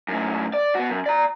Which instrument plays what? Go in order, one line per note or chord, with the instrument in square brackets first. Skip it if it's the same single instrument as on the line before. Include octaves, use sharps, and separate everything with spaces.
[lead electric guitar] F#2 A2
D5
B3 F#4
F#2
D5 A#5